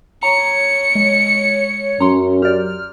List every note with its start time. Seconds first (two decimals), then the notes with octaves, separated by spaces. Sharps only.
0.23 C#5 A#5 C#7
0.95 G#3
2.00 F#2 C#4 A#5 C6
2.42 G4 D5 F6